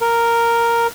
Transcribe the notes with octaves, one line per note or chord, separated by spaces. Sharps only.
A#4